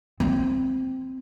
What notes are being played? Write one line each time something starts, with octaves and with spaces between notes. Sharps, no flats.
C4